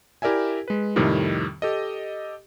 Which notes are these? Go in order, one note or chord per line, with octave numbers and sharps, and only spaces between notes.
E4 G4 A#4 D5 E5 G#5
G#3 B4
F2 A2 C3 D#3 G3
G4 A4 D#5